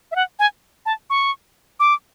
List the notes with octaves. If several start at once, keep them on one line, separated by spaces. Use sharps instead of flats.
E5
F#5
G#5
A5
C#6
D6